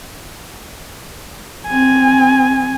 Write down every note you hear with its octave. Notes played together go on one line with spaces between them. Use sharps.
C4 G#5